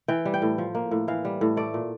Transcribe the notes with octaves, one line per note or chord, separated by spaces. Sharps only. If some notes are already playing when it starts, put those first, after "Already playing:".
E3 G5
G3
G5
A2
F3
A#3
A2
E3 F5
G3
A2
A3 D5
A#2